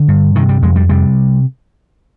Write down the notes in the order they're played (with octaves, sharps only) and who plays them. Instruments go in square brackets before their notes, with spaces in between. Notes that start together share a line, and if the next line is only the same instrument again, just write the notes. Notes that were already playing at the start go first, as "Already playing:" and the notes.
Already playing: [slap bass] D3
G2
C3 D#3
G3
F2 G#3
G3
C3 G3